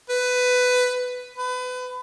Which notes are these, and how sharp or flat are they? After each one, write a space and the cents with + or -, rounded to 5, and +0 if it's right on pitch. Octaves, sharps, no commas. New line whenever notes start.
B4 +15
B4 +30